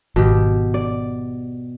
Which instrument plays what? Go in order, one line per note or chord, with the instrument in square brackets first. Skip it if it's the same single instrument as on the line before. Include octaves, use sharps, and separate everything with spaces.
[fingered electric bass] G#1 [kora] B2 G4
[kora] D5